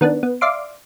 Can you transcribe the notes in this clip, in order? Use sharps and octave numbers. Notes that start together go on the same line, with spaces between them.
D#3 B3 D4
B3
D5 E5 F5 C6 D6